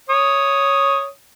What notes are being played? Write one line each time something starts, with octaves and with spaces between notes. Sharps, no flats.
C#5 D#6